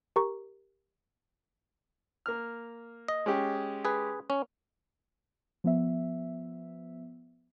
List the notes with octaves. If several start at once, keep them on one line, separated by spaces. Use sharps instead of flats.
G4 A#4 A#5 C#6
A#3 F6
D#5
G#3 C#4 G4
G#4 B4
C#4
F3 B3 E5